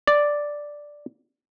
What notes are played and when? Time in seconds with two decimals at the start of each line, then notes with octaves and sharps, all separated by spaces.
0.07 D5